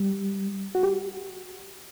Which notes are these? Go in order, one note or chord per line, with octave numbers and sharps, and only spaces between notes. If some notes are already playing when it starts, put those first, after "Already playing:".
Already playing: G3
F#4
G4